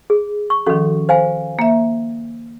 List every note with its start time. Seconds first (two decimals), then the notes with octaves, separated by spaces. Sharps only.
0.10 G#4
0.50 C#6
0.67 D#3 F3 C#4 F#4 A4
1.09 C5 F5 G#5
1.59 A#3 E5